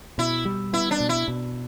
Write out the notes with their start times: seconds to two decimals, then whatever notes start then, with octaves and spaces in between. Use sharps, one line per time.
0.18 B2 E4
0.45 G3
0.73 B3 E4
0.91 D4
1.00 B2
1.09 E4
1.28 B2